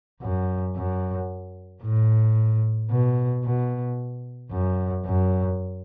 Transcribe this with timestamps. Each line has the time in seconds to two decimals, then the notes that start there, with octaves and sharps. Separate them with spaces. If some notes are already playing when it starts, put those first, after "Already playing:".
0.22 F#2
0.76 F#2
1.83 A2
2.90 B2
3.44 B2
4.51 F#2
5.05 F#2